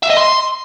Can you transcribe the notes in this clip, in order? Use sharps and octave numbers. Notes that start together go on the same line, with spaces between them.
E5
D#5
C6